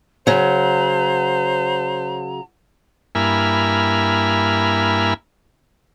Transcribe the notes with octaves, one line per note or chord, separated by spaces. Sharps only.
C#3 F#3 C5 A#5
G2 A#3 E4 G#5 B5 F6